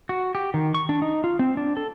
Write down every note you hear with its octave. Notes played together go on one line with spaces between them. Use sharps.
F#4
G4
D#3
C#6
D4
D#4
F4
C4
D4
A4